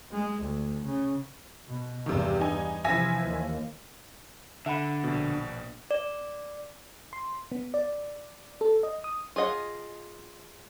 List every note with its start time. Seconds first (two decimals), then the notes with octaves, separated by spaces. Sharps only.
0.12 G#3
0.42 D2
0.85 C#3
1.68 B2
2.06 E2 G2 C3 D#3
2.41 D#4 G#5
2.84 C3 E3 F3 E5 G#5 A#6
3.25 D#2
4.66 D3 E5 F#5 B5
5.04 A#1 B2
5.91 D5
7.13 C6
7.52 B3
7.74 D5
8.61 A4
8.83 D#5
9.04 D#6
9.36 F4 G#4 D#5 F#5